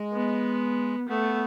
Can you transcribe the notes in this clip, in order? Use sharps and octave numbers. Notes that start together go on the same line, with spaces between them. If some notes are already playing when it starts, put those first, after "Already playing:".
Already playing: G#3
B3
A3 B3